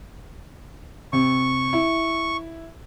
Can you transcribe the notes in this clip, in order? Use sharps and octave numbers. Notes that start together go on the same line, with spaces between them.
C3 C#6
E4